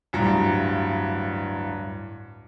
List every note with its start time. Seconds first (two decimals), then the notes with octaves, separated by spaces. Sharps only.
0.13 D1 G2 A#5